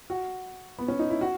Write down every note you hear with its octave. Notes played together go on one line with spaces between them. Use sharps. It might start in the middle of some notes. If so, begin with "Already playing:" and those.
F#4
B3
C#4
D#4
E4
F#4